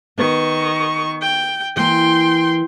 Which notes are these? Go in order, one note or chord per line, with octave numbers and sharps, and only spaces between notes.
D#3 B3 B4 C#6
G5
E3 A#3 G5 C6